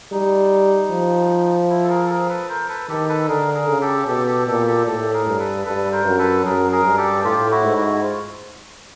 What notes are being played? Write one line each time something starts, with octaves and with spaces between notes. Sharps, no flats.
G3 D#4
F3
E4
A4
G#4 A#4
A4
G#4 A#4
A4 B4
A#4 C5
A4 B4
D#3 G4 A4
A4 B4
D3 G#4 A#4
G#4 A#4
C#3
G4 A4
B2 G4 A4
G4 A4
A#2 G4 A4
G4 A4
A2 G4 A4
G#4 A#4
G2
A4 B4
G2 A4 B4
A#4 C5
F#2
A4 B4
F#2 G#4 A#4
G#4 A#4
G2
G4 A4
A2 F4 G4
E4 F#4
G#2
E4 F#4
F4